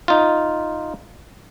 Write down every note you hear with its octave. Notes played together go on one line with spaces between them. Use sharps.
D#4 F4